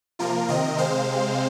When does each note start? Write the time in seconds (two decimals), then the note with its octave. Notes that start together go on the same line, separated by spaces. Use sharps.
0.19 C3 F3 A#3 F4 A#4
0.48 C3 D#3 C4 A#4 D#5
0.78 C3 G#3 C4 C5 F5